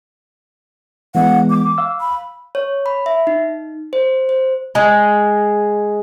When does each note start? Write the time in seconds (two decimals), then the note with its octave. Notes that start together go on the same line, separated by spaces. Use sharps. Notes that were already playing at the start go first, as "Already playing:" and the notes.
1.15 E3 G#3 B3 F#5
1.50 D6
1.78 F5 E6
2.00 B5
2.55 C#5
2.86 B5
3.06 E5
3.27 D#4
3.93 C5
4.29 C5
4.75 G#3